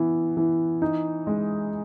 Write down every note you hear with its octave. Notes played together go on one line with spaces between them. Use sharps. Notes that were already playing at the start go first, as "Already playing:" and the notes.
Already playing: E3 B3
E3
D#4
G#3